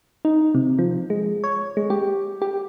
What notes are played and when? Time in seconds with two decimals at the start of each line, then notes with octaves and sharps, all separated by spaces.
0.25 D#4
0.55 C3
0.79 F3
1.10 G#3
1.44 C#5
1.77 G#3
1.90 G4
2.42 G4